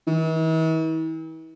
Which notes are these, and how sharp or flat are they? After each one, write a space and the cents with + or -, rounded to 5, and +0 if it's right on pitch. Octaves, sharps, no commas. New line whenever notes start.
E3 -45